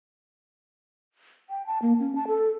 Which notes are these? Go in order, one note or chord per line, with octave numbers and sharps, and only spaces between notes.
G5
A5
A#3
C#4
A5
A4